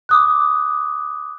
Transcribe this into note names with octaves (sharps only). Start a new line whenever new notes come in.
D6 D#6 F#6